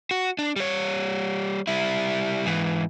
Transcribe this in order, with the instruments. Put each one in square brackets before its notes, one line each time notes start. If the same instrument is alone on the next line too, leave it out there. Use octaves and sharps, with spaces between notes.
[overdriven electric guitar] F#4
D4
G3 C#5
G3 E4
G#2 E3